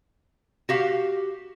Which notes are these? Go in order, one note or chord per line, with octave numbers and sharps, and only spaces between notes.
F#4 G4 F5